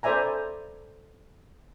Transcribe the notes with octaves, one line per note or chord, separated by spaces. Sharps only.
A4 C5 D5 E5 G#5 A#5